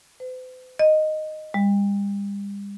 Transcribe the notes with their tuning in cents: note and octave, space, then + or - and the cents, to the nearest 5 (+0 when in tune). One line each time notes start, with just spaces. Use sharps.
C5 -45
D#5 -5
G3 +40